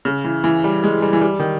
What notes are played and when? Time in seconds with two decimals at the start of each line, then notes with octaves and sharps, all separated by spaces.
0.05 C#3
0.24 E3
0.44 E3
0.64 G3
0.84 G#3
1.02 G3
1.13 E3
1.22 G3
1.40 D#3